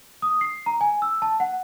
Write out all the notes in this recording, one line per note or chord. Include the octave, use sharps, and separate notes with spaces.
D#6
C7
A#5
G#5
E6
A5
F#5